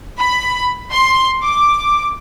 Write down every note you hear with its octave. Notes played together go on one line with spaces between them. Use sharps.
B5
C6
D6